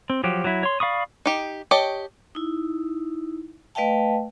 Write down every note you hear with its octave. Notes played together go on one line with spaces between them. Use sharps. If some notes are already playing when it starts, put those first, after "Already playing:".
C4
F3 F#3 G4
F#3 E4
C#5 C6
D5 F5 B5 C#6 D#6
D#4 G4
G4 C#5 D#5 A5
D#4 E4
A3 B4 D#5 F5 G5 A5